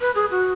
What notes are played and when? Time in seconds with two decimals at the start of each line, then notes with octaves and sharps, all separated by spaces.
0.01 B4
0.15 G#4
0.31 F#4